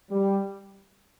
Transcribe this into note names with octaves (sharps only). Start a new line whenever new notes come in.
G3